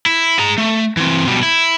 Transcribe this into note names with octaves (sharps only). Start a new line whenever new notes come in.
E4
G#4 A#5
A3
E3 C4
B2 G3
E4